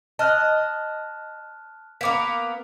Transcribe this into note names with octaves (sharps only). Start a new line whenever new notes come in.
D#5 A5 F6 F#6
A#3 B3 A#4 D6 B6